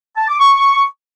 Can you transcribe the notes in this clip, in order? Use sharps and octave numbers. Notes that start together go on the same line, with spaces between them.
A5
D6
C#6